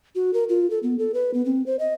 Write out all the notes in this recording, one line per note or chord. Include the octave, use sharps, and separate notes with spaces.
F#4
A#4
F4
A4
B3
A4
B4
B3
C4
C5
D#5